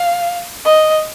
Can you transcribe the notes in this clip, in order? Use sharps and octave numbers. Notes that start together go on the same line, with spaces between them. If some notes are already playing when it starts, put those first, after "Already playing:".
Already playing: F5
D#5